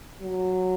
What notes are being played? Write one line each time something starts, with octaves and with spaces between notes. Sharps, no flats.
F#3